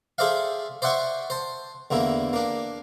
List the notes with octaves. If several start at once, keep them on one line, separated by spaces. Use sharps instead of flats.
G#4 A4 C5 D5 E5 F5
C5 D5 E5 F#5 C6 C#6
C5 A5
E2 D3 A#3 E4
A#3 D4